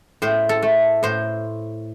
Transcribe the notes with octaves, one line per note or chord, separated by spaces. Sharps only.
A2 C5
A4
A3
A2 C5